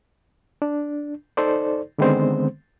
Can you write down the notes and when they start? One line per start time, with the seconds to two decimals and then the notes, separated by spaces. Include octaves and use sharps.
0.62 D4
1.37 D#4 A4 C5 D5
1.98 D3 D#3 G#3 B3 C4 C5